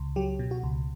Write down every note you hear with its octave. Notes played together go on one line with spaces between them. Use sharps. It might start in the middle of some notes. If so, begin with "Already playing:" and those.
Already playing: C#2
F#3 G4
B2
F#4
C#2